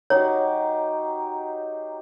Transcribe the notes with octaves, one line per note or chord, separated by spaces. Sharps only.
F#3 D#4 G4 C#5